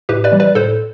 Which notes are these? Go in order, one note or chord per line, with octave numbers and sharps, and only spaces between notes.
A2 G4 B4
B4 D5
E3 G3
B4 D5
A2 A4 C5